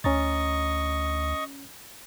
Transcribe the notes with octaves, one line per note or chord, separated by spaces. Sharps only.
D2 C#4 D#5 A#5 C#6 A6